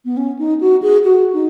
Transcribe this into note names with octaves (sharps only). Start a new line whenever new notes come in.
B3
C#4
D#4
F#4
G#4
F#4
D#4